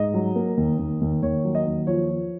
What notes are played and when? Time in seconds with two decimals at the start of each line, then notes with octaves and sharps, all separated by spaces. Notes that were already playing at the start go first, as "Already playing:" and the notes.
Already playing: G#2 D#5
0.14 F#3
0.36 A#3
0.57 D#2
0.79 D#2
1.01 D#2
1.22 D#2 C#5
1.45 F#3
1.55 D#5
1.66 D#2
1.87 F3 C#5
2.10 F3